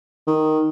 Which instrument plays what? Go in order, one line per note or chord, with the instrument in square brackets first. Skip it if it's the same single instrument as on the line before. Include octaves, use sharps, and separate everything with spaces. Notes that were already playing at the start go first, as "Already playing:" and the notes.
[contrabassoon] D#3